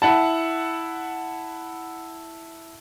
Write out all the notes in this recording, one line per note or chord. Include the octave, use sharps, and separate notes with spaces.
E4 F#5 A5